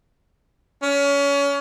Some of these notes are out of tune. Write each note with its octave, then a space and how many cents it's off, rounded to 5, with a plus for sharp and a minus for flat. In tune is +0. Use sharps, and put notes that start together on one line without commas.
C#4 +30